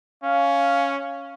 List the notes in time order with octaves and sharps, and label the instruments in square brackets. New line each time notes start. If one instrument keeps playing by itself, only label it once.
[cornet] C#4 [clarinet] F5